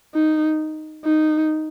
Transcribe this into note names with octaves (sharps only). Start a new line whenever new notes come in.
D#4
D#4